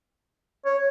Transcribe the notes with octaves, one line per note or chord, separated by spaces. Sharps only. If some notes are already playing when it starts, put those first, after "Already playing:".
C#5